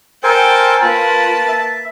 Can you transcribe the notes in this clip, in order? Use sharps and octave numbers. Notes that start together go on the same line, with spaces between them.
A4 A#4 C5 G5 G#5
A#3 F4 B4 A5
E5